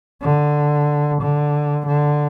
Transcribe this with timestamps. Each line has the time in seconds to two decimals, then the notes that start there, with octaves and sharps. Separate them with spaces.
0.22 D3
1.21 D3
1.87 D3